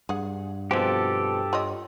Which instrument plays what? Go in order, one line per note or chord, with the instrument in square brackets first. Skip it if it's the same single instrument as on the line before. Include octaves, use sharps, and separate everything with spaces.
[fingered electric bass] G2 [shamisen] G#4 F#5
[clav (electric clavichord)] B2 F3 C4 [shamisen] G#3 [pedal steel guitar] G4 A4
[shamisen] F4 C#5 D#5